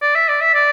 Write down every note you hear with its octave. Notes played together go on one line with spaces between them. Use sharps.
D5
E5
D5
E5
D5